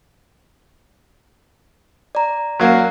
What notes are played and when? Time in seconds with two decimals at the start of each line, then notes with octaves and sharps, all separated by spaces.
2.15 D5 A#5
2.60 F#3 A#3